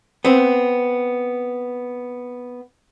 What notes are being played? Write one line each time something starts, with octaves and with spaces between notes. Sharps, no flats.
B3 C4